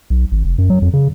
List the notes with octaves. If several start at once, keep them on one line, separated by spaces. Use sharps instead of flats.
B1
G#1
F1
F#2
F#3
F2
C#3